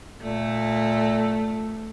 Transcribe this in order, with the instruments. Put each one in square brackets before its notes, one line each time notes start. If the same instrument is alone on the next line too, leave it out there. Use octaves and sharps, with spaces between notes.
[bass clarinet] A#2 [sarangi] A3